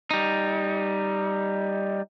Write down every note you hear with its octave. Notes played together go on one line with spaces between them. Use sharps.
G3 D#4